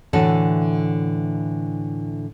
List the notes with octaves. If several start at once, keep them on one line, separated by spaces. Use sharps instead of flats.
A2 D3 E3 F#4 A4